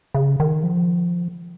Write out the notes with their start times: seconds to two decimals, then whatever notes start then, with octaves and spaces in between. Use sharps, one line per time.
0.14 C#3
0.40 D#3
0.63 F3